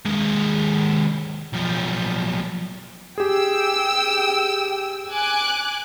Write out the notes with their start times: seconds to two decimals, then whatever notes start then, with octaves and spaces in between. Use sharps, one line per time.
0.06 D#2 G#3
1.53 B1 F3
3.18 G4 G#4 G5 E6
5.10 G#5 D6 F#6